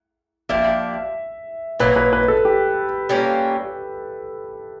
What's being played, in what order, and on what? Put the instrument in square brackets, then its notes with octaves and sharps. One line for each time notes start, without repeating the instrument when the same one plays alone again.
[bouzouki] F3 A#3 D4 G4 [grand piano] E5
[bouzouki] A#2 F#3 A#3 D#4 [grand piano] B4
[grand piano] B4
B4
A4
G4
[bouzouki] G3 A#3 C#4 F4